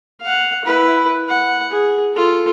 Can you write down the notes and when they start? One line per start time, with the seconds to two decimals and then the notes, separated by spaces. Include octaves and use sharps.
0.21 F5 F#5
0.65 E4 B4
1.29 F#5
1.71 G#4
2.14 F4 A4